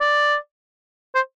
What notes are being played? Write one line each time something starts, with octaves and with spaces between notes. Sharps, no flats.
D5
C5